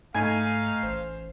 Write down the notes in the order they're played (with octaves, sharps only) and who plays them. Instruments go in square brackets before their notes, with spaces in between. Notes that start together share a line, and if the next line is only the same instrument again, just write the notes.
[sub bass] G#2 [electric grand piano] A3 D#4 [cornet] F5 [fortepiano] G#5
[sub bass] A1 [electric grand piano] C5